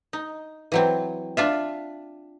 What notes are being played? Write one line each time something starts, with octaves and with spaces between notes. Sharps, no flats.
D#4
E3 F#3 C4
D4 F4 E5